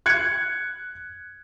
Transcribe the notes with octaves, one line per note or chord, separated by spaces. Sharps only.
F#6 G#6 C#7